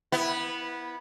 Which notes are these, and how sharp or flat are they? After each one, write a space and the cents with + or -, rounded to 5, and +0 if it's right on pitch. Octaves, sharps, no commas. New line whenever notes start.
B3 -15 E4 +0